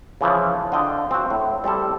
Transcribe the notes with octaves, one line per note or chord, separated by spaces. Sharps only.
C#3 E3 F3
D3 F4 D#5 G5
C4 F#4
A2
G3 C4 E4 A4